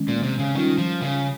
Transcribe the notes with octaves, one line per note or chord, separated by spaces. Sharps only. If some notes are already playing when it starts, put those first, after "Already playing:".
Already playing: D#3 G#3 C#4
A#2
C3
C#3
D#3 G3 C#4 F4
F3
C#3